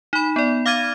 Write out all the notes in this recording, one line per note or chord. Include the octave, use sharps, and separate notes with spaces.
D#4 B5
B3 D5
F5 D6 F6 G#6 A6 D#7